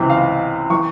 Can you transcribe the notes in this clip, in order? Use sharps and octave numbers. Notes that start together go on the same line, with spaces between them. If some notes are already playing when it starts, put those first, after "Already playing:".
Already playing: C#2 C3 E3
F5
E3 C#6